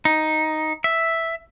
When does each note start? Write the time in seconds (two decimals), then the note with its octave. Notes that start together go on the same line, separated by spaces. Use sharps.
0.05 D#4
0.84 E5